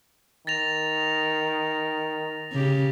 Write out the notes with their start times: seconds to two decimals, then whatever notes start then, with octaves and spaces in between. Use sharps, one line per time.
0.47 D#3 A6 A#6 F7
2.53 C#3 G4